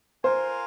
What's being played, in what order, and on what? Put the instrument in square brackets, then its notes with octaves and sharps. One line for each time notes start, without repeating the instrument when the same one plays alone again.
[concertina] F4 A#4 F5 G#5 [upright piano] C5